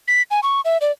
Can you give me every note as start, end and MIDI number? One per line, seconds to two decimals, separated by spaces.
0.08 0.22 95
0.31 0.40 80
0.43 0.61 85
0.65 0.78 76
0.81 0.91 74